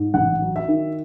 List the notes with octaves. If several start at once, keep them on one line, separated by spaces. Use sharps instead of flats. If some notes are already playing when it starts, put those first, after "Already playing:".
Already playing: G#2
A1 F#5
F#3
E5
D#3